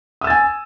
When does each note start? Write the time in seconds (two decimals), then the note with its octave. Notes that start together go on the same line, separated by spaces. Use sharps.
0.21 D#6
0.24 E6
0.27 A6
0.30 G#5